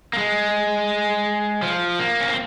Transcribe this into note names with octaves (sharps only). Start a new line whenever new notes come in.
A#3
G#3
F3
A#3
C#4
C4